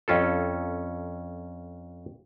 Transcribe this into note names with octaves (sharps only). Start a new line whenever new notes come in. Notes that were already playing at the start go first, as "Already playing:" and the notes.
F2 C#4 F4 A4